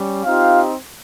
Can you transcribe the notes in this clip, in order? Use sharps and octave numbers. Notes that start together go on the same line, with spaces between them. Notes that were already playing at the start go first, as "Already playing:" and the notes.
Already playing: G3 C#4
C4 D#4 F4 G4 F5